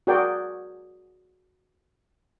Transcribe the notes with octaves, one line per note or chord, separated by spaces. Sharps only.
F#4 G#4 A#4 D5 G5